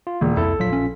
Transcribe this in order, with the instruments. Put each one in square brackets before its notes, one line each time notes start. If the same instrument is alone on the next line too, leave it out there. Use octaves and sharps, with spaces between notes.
[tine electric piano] F4
[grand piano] E1 [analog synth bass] A#3
[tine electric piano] C2 E4 [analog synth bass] F2 [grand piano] A4
[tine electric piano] A#1 F4 B6 [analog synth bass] F#3
[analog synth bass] C#4